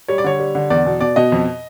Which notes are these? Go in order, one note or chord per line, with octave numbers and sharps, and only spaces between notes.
G3 C#5
D5
D3 C#5
G3
D3
E2 D5
B2
B2 D5
B2 D#5
F2